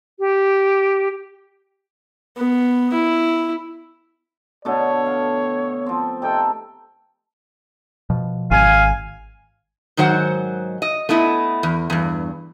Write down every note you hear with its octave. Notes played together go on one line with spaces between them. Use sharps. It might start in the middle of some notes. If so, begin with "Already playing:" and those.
G4
B3
E4
B2 D3 A3 C#5
F5 G5
F3 C4
C3 D#4 A4 G5
B2 F3
G#1 F5 G#5
G#2 D#3 F#3 C5 F#5
D#5
A3 B3 E4 D#5
E2
E2 G2